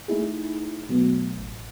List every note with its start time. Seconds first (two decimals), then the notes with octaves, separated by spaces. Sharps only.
0.08 A3 D#4 E4 G#4
0.89 B2 F#3 A3 B3
1.38 A1